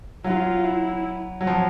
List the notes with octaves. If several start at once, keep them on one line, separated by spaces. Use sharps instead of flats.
F#3 F4
E4
F#3
F3